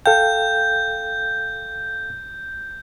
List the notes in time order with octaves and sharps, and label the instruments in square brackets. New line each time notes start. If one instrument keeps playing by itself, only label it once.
[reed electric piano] A4 F5 G5 [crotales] G6